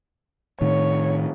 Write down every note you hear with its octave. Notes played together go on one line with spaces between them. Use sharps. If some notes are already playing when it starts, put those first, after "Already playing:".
A2 D#3 C#5